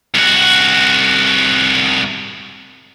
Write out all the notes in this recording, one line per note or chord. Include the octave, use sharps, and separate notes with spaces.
C2 F#4